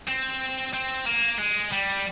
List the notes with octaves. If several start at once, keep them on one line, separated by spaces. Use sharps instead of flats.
C4
C4
A#3
G#3
G3